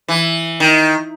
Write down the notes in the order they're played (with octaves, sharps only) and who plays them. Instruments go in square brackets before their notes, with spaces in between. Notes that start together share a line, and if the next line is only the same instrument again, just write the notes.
[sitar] E3
D#3